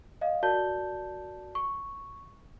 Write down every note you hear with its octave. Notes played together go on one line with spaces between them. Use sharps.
D#5 F5
F#4 A#4 D5 A5 G6 G7
C#6